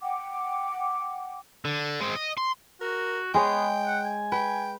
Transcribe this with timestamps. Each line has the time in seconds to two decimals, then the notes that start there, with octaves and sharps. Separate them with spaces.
0.01 F#5 G5 D6
1.65 D3
2.00 G#3 C4
2.15 D#5
2.37 C6
2.81 F#4 A#4
3.34 G#3 B3 G#4 C#5 G5
3.86 F#5
4.05 G#5
4.32 B4 G5